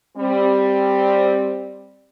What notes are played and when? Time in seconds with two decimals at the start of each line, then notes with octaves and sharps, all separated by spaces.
0.17 G3 C4